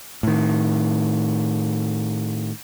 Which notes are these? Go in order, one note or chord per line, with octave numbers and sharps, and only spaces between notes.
A2 D#3